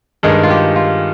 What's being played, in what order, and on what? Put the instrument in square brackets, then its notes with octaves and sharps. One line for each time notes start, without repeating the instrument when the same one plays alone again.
[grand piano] G2 D#3 G#3 [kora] G#4
[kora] F4
G4
F4